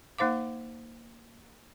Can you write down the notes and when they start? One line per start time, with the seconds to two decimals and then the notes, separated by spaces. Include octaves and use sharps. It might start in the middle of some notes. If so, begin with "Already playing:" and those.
0.18 A#3 D#4 C5 F5 D6